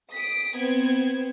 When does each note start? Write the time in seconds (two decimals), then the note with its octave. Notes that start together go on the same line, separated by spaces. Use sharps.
0.11 D#6 B6 D7
0.57 B3 C4 G#6